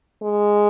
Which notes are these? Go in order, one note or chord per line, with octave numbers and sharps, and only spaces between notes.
G#3